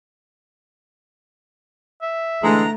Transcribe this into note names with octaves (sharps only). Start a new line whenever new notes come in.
E5
D3 E3 G#3 A3 A#5